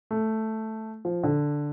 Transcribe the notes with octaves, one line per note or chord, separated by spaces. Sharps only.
A3
F3
D3